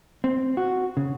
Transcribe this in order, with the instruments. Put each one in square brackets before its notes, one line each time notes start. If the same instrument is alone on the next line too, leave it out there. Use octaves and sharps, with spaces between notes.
[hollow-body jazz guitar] C4
F#4
C#3